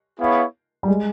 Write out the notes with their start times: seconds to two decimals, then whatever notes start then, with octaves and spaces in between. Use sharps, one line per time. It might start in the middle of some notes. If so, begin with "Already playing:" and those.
0.20 B3 E4 G#4 C#5 F5
0.83 G3
0.88 G#3